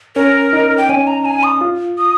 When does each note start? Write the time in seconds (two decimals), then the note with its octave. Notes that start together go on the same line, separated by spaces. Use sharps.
0.16 C#4 A#4
0.53 D#4
0.78 G5
0.89 C#4 G#5
1.07 A#5
1.25 G#5
1.43 D#6
1.61 F4
1.98 D#6